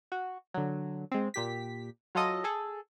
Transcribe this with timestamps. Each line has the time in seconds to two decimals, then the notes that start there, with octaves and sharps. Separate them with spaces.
0.12 F#4
0.54 D3 F#3
1.11 G#3 C4
1.34 A#2 G4 B6
2.15 F#3 F4 A4 D#5
2.44 G#4 A4